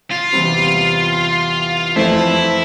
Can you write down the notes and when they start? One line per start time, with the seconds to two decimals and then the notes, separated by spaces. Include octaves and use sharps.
0.11 F4
0.33 E2 C3 G3 C4
1.96 F2 E3 A3 C4 E4